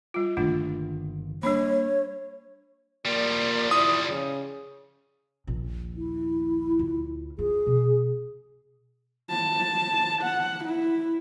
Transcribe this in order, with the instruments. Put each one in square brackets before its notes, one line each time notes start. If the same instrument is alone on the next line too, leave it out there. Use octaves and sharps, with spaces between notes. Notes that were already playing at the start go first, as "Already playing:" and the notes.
[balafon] G3 F4
[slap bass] G1 A#2 D#3 [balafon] A3 D4 F4
[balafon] G3 D4 B5 [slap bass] A#3 [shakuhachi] C#5
[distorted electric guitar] F3 G3 [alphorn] A#3 [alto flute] D5
[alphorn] E4 [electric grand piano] D#6
[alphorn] C#3
[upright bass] A#1 D#2
[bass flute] E4
[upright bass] D2 F4
[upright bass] F4 [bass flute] G#4
[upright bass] B2
[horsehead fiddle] A5
F#5
E4